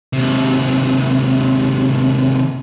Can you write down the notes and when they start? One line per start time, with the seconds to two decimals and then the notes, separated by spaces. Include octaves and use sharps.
0.13 D#2 C3